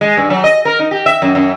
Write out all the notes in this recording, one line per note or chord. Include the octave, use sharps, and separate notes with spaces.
G#3
G2
F#3
D#5
A#4
D#4
G4
E5
F#2
F#2